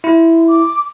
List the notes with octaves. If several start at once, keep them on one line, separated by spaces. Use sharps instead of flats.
E4 C6
D6